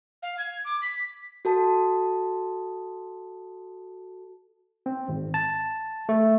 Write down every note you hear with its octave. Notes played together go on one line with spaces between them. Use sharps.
F5
G#6
D6
B6
F#4 A4 A5
C4
G#1
A5
A3